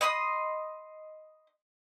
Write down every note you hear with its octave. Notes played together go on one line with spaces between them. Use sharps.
D#5 B5 C6 D#6